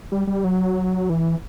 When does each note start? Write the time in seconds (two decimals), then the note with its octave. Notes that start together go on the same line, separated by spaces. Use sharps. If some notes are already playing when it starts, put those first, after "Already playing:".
0.12 G3
0.27 G3
0.44 F#3
1.10 E3